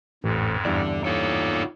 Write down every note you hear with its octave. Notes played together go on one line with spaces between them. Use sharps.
A1 F2 G#2
E2 G2 D3 D5
A#3 B3 D#4 F4 A4 C#5